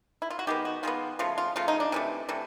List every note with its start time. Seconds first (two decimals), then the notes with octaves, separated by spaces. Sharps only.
0.22 E4
0.30 F4
0.39 F#4
0.47 D#3 G#3 B3 G4
0.65 F#4
0.83 D#3 G#3 B3 F4
1.19 C#3 F3 A3 F4
1.38 F4
1.56 C#3 F3 A3 F4
1.68 D#4
1.80 D4
1.92 C3 E3 A3
2.29 C3 E3 A3